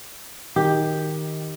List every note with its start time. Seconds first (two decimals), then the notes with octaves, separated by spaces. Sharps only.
0.56 D#3 G4